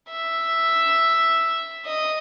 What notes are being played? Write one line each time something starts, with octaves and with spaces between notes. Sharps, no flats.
E5
D#5